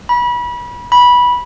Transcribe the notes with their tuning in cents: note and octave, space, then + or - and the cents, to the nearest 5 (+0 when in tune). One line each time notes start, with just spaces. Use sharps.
B5 -30
B5 -15